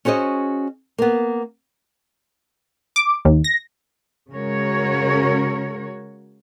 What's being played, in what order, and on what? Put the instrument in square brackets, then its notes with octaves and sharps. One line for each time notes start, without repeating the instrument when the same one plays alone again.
[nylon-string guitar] C#4 F#4 G#4 C5 D#5
A#3 B3
[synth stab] D6
D#2
A#6
[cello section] C#3 G#3 C#4 F#4 A#4 C#5